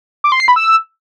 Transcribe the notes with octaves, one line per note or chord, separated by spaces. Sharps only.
D6
C6
C7
B5
E6